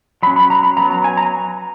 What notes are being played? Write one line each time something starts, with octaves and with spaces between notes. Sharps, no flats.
F#3 C#4 B5
B5
A#5
B5
F#3 B3 A#5
A#5
G#5
A#5